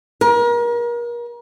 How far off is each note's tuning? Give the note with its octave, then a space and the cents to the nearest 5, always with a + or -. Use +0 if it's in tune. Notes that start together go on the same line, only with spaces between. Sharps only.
A#4 +35